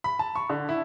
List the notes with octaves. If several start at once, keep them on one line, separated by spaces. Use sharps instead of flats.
B5
A5
C#6
D3
E4